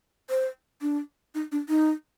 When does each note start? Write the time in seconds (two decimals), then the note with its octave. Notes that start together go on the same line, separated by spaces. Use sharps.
0.30 C5
0.82 D4
1.35 D#4
1.52 D4
1.69 D#4